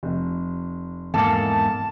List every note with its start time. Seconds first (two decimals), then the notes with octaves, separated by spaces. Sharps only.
0.03 F1
1.14 E2 G#2 A#3 A4 A5